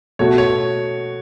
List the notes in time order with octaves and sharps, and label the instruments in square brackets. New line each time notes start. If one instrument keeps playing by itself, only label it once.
[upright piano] B2 A3 F#4 [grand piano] C#5
[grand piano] C#5